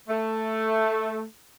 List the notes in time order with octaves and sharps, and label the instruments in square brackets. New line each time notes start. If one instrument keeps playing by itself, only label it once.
[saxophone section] A3